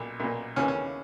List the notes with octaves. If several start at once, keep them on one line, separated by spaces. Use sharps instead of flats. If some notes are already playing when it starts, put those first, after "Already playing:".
Already playing: B1 A#2
B1 A#2
D#2 C#3 E3 C#4
C#4